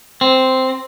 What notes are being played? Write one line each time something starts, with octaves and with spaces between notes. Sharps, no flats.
C4